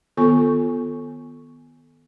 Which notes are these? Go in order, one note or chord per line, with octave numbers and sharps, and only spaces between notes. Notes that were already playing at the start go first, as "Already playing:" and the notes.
D#3 B3 F4 A4 G#5 C#6